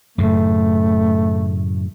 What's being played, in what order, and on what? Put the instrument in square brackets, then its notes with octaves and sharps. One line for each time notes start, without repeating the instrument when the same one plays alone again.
[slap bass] F#2 A2 C#3 [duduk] A3